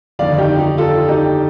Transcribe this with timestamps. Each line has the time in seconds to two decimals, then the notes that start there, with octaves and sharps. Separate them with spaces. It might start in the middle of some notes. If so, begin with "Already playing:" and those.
0.19 G1 F2 D#3 D5 F5
0.38 D#4 G4
0.58 D#4 G4
0.78 F4 A4
1.08 D#4 G4